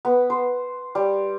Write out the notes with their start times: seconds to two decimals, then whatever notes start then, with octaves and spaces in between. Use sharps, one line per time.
0.05 B3
0.30 C5
0.95 G3